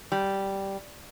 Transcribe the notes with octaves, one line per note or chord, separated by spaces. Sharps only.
G3